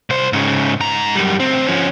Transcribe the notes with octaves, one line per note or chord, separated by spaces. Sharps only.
C2 C5
G#2 C#3
G#2 A#5
F#2 G3
D2 C4
F3 C#4